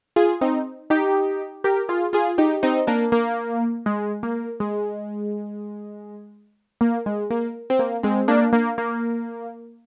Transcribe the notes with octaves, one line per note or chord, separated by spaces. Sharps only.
F4 G#4
C4 D#4
D#4 G4
G4 A#4
F4 G#4
F4 G#4
D#4 G4
C4 D#4
A#3 D4
A#3
G#3
A#3
G#3
A#3
G#3
A#3
C4
A#3
G#3 C4
A#3 D4
A#3
A#3